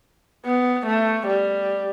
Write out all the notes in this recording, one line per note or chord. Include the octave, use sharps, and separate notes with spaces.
B3
A3
G3